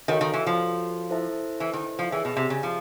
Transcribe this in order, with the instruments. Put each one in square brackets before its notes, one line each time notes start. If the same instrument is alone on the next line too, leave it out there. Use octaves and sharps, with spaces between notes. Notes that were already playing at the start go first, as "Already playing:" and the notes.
[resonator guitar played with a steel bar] D#3 [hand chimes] F#4 A4 C#5 F5
[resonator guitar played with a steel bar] D#3
E3
F3
[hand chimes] E4 A4 C5 E5 A5
[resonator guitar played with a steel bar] E3
D#3
F3
[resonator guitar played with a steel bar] E3 [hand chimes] G#4 C#5 E5 G5
[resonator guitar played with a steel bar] B2
C3
C#3
F3